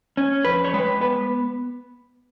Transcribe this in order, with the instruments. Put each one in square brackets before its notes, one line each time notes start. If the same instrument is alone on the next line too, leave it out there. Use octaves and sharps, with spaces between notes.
[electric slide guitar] C#4
F2 B4
C#5
G#3 B4
B3 B4